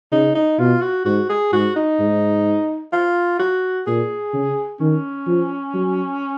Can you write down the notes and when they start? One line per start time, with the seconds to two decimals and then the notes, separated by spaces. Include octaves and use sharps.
0.12 C#3 D#4
0.35 D#4
0.59 B2 F4
0.82 F#4
1.05 G#2 F#4
1.29 G#4
1.53 G#2 F#4
1.76 D#4
2.00 G#2
2.93 F4
3.39 F#4
3.87 A#2 G#4
4.34 C#3
4.80 D#3 C#4
5.27 F3
5.74 F#3